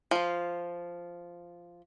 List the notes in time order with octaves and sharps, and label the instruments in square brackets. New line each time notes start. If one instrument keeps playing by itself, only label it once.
[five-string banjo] F3 F4